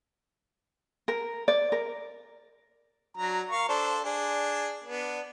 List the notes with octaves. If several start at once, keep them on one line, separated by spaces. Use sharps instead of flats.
A#4
D5
A#4
F#3 D4 A#5
A#4 F5 C#6
D4 A4 C5
D4 G#4
B3 D4